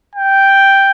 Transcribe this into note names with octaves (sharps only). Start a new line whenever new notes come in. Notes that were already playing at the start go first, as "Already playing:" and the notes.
G5